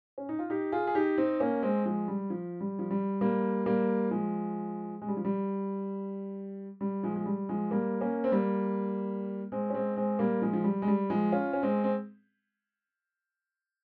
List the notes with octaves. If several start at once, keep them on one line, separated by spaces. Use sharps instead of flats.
C#4
D#4
F4
D#4 G4
F4 G#4
G#4
D#4 G4
C4 D#4
A#3 C#4
G#3 C4
F3 G#3
G3
F3
G3
F3
G3
G3 A#3
G3 A#3
F3 G#3
G#3
G3
F3
G3
G3
F3 G#3
G#3
G3
F3 G#3
G3 A#3
A#3 C#4
C4
G3 A#3
G#3 C4
C#4
G#3 C4
G#3 C4
G3 A#3
F3 G#3
F3
G3
G#3
G3
F3 G#3
C#4 F4
C#4
G#3 C4
C4